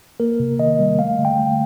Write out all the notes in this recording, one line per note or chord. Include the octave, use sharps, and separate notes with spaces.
A#3 A#4
C3
D#3 D#5
G3
A3 F5
D3
G5
A3